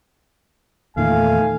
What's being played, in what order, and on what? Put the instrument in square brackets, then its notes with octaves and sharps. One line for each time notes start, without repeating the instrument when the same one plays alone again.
[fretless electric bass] E2 A#2 D#3 [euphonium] A3 [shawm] F5 [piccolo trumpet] G#5